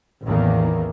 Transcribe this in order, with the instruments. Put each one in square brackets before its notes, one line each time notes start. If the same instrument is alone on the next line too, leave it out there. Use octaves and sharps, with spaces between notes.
[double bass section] A1 E2 D#3 E3 A#3